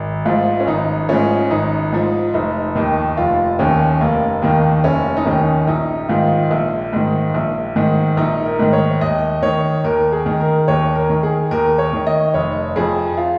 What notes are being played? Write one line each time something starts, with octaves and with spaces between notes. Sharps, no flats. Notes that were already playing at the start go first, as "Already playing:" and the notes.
Already playing: G#1
G#2 F3 F4
C#4
G#1 D#4
G#2 F3 C#4
G#1 D#4
G#2 F3
F1 D#4
D#2 D#3
F1 F4
D#2 D#3 C#4
F1 A#3
D#2 D#3 A#3
F1 C#4
D#4
D#2 D#3 C#4
A#1 D#4
G#2 D#3 F4
A#1
G#2 D#3
A#1
G#2 D#3
A#1 D#4
A#4
G#2 D#3
C#5
D#2 D#5
D#3 C#5
D#2 A#4
G#4
D#3
A#4
D#2 C#5
A#4
D#3
G#4
D#2 A#4
C#5
D#3
D#5
F1 C#5
F2 F3 G#4
F4